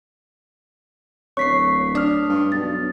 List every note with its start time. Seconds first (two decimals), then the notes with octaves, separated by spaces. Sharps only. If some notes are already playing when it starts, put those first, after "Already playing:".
1.37 D1 C#5 C#6 B6 C7
1.95 D4 D#6 F6
2.29 G2
2.52 B1 A6